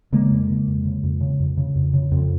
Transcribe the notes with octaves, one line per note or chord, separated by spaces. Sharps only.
C#3 G#3 A#3
F2
C#3
F2
C#3
F2
C#3
F2
C#3
F2
C#3
F2